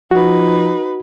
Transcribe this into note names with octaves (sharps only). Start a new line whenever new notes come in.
F3 D#4 F#4 B4